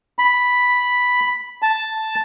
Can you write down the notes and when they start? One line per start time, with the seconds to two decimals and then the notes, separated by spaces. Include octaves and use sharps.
0.19 B5
1.62 A5